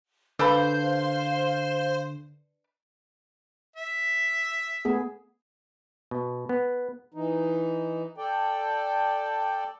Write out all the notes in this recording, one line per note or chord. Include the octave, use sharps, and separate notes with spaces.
D3 D4 A4 B4 C5 F5
E5
A3 B3 G#4
B2
B3
E3 D#4
A4 D5 G5